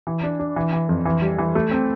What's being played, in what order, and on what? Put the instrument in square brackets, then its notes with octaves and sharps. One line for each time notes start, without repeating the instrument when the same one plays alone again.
[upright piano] E3
D4
D4
E3
E3
F2
E3
G3
E3
A3
C4